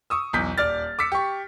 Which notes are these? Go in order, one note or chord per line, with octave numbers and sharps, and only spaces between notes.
C#6 D#6 E6
B1 E2 G6 B6
D#1 D5 F6 A6
D6 E6 B6 C#7
G4 C#6